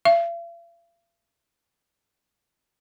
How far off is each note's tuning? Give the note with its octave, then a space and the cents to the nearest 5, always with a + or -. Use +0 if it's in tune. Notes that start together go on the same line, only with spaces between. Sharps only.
F5 -45